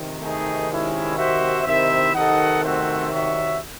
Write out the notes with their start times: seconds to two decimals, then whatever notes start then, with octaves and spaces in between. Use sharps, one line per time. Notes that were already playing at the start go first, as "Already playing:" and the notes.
Already playing: C3 D#3
0.20 A3 D#4 G#4
0.69 G#3 C#4 E4
1.17 F#4 C5 E5
1.66 C3 D#3 E4 C5 E5
2.14 C3 D#3 D#4 A4 D#5 F#5
2.62 A3 C4 F#4 C5 E5
3.11 F#4 C#5 E5